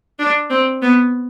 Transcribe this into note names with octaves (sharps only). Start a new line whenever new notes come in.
D4
C4
B3